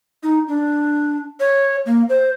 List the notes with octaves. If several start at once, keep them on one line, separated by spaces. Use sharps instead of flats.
D#4
D4
C#5
A#3
C5